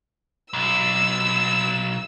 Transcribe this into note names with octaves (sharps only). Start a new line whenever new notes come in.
B1 E6